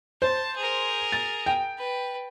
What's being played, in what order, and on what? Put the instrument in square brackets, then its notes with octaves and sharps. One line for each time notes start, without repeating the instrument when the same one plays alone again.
[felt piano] C5 [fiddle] A5
[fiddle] G#4 A#4
[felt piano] A6
G5
[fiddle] B4